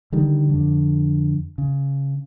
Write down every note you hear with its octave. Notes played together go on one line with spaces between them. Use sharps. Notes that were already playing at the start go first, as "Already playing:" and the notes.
D3 D#3 G3
F2 D3
C#3